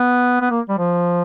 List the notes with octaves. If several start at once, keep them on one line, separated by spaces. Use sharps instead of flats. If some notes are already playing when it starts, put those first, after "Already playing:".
Already playing: B3
B3
A#3
G3
F3